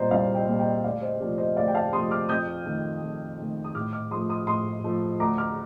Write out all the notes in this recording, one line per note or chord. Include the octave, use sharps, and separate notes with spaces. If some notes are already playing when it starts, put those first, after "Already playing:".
Already playing: C2 A#2 G3 C5 D5 D#5 A#5
C2 D5 F5
D#5 G5
A#2 G3
D#5 G5
D2 D5 F5
C5 D#5
C3 F3 A3 D5
C5 D#5
D2 D5 F5
G5
F5 A5
C3 F3 A3 C6 D#6
D6 F6
F2 D#6 G6
D#3 A3
F2
D#3 A3
D#6
A2 D6 F6
D6 F6
F3 A3 C6 D#6
C6 D#6
A2 C6 D#6
F3 A3
D2 A#5 D6
D6 F6